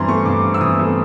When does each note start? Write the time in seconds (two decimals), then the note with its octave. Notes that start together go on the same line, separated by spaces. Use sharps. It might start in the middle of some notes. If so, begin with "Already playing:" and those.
Already playing: G2 E3 C4 A#5 C6
0.08 A3 C#6
0.26 G2 D6
0.43 C4
0.54 E6
0.61 E3 D#6
0.79 A3